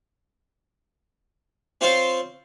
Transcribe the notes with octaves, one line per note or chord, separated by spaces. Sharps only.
C4 F4 C5 C#5 F5